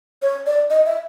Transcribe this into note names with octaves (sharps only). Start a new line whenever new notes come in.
C#5
D5
D#5
E5